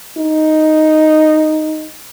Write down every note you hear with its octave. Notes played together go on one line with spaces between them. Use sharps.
D#4